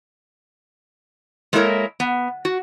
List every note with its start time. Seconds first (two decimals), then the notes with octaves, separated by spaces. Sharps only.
1.53 G#3 A#3 E4 A4 A#4 C#5
2.00 B3
2.45 F#4